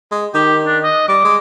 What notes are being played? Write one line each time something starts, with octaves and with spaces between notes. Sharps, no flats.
G#3
D#3 G4
D4
D#5
G3 D6
G#3